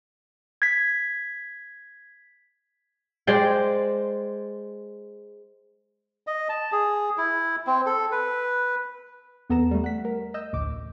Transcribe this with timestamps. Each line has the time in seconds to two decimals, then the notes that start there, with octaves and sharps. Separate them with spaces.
0.62 G#6 B6
3.27 G#3 C5 D5 G5
6.27 D#5
6.49 A5
6.72 G#4
7.18 E4
7.67 C4
7.86 A4
8.12 B4
9.50 E2 B3 A4 A#5 E7
9.71 G3 A3
9.84 F#5 B6
10.05 A#4
10.34 D#5 E6 G6
10.53 A1 D2 D6